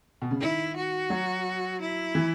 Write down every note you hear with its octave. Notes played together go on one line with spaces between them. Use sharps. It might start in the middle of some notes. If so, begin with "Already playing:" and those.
B2
C#3
D#3 E4
F#4
F#3
E4
E3